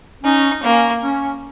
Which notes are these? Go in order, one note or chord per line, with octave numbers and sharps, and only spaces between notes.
C#4 D#4
A#3 C#4
C#4